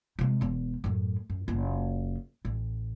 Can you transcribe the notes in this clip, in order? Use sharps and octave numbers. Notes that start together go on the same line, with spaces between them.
C3 G#3
E1 E2
F#2 A2
F#2
F#1 F4
A1